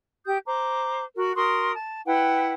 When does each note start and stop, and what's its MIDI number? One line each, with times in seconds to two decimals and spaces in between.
0.25 0.38 67
0.25 0.38 87
0.25 0.38 91
0.45 1.03 72
0.45 1.03 82
0.45 1.03 86
1.15 1.35 66
1.15 1.35 70
1.35 1.72 66
1.35 1.72 70
1.35 1.72 84
1.35 1.72 87
1.73 2.01 81
2.06 2.54 64
2.06 2.54 71
2.06 2.54 78
2.06 2.54 79